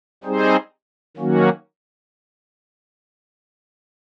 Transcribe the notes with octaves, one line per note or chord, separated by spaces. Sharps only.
G3 C4 D#4 G#4 C5
D#3 F#3 A#3 C#4 F#4